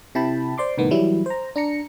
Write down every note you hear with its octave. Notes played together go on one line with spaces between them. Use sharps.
C3 E4 G5 A5 B5
C5 D5 C6 D6
C2 A2 D#3 B3
E3 F#3 G3 E4
C5 A#5
D4 A#5 C#7